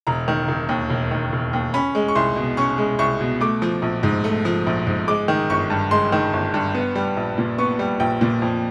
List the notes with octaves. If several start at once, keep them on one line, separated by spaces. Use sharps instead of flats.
E1 A#5
D#3
E1
D#2
E1
D#3
E1
D#2
C#4 B5
G#3
C#6
C2 C6
B2
C#4 C#6
G#3
C2 C#6
B2
A3 D6
F3
A#1
G#2
A3
F3
A#1
G#2
G#3 D6
D#3
G1 C#6
G2
G#3 C6
D#3
G1
G2
B3
G3
A#1
A#2
B3 C#6
G3
A#1 G5
A#2
F2